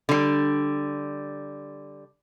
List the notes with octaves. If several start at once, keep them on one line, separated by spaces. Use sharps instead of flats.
D3 G3